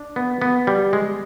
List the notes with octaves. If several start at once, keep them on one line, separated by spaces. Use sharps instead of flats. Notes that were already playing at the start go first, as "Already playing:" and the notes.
Already playing: D4
B3
B3
G3
G#3